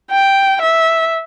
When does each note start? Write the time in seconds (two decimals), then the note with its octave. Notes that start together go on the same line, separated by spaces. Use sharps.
0.11 G5
0.62 E5